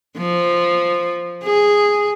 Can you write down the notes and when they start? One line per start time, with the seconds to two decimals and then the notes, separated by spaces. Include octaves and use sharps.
0.17 F3
1.44 G#4